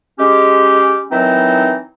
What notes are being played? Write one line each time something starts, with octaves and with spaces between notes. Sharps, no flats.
G#3 C#4 G4
D#3 E3 F#3 C4 D#4 E4